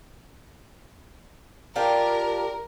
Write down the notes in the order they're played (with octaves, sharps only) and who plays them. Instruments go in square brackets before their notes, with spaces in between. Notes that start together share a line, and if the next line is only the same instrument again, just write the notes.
[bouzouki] D4 F4 G4 [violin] A#4